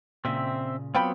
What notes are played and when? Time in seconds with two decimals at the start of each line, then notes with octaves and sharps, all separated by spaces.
0.25 A#2 C#3 C4 E5
0.95 F#3 B3 C4 F4 G5 B5